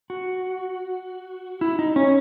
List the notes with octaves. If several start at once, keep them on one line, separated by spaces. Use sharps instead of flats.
F#4
E4
D#4
C#4